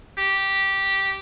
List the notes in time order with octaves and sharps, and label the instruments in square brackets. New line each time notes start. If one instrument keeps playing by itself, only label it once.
[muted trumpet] G4